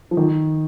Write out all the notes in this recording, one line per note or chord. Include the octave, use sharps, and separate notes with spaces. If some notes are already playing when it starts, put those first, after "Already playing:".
F3
D#3